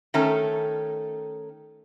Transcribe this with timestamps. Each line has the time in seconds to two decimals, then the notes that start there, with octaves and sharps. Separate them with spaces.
0.14 D#3 A3 C#4 A4